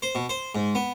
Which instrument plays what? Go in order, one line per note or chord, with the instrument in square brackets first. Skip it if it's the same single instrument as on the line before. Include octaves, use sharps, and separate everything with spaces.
[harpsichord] C5
B2
C5
G#2
B3